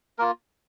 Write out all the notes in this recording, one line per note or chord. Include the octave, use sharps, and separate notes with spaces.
A#3 F4 A#4